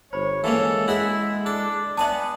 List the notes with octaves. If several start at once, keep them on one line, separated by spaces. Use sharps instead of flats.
G1 C5 C#5 B5
E3 G#3 A#3 C#4 A4
E4 F#4 G#4 E5
D4 A4
B3 D4 E5 G#5 A5 C#6